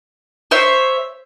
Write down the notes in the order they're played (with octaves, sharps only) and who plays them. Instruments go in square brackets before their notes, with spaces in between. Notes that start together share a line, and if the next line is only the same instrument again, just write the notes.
[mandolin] C5 C#5 E5